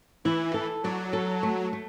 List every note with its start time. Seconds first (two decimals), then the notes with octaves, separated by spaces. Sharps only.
0.25 E3 E4
0.54 A4
0.84 F#3 D5
1.13 A4
1.43 A3
1.73 A3